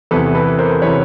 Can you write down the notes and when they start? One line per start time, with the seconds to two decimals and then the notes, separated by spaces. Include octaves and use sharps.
0.11 E2 C3 E3 A4 B4
0.35 A4 B4
0.58 A#4 C5
0.82 C3 E3 B4 C#5